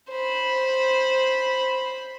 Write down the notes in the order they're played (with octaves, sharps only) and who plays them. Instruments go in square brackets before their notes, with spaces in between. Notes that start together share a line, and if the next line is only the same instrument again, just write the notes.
[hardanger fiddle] C5 B5